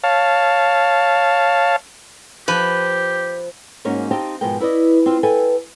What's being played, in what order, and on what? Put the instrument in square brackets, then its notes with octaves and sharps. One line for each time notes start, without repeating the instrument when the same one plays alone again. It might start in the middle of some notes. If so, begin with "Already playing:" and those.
[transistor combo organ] C#5 F5 A5
[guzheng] F3 [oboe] G4 [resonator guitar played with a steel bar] B4
[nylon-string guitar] G#2 A#3 C#4 D#4 F#4
C4 D#4 G4 F5 G5 A5
G#2 B2 F3 B3 A#4 G5
E4 B4 D5 D#5
C4 F4
A4 B4 E5 G5 G#5